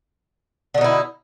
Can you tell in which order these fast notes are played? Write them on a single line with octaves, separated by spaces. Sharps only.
D3 B2 D#4 E4